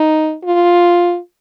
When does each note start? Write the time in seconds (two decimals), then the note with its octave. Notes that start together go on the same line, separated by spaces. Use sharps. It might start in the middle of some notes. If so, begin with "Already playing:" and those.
Already playing: D#4
0.44 F4